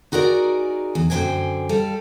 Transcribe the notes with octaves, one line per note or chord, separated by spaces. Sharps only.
D#4 F#4 G#4 A#4 D5
E2
F#2 D3 A3 C5 G5 G#5
G3 A4 F5